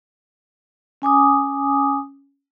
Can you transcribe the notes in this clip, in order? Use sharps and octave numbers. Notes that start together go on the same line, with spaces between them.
C#4 G#5 D6 D#6